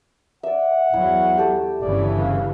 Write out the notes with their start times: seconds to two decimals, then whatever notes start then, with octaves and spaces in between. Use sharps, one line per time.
0.43 D5 E5 F#5
0.94 E2 F#3 E4
1.38 G4 A4
1.81 G1 C#3 E3 D5
2.19 F5